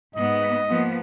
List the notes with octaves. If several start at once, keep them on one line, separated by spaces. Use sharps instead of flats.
G#2 B3 D#5
F3 A#3 B3